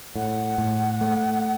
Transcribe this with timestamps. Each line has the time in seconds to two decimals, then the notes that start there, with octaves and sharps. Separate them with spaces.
0.16 A2 F#5
0.58 A2
1.01 A3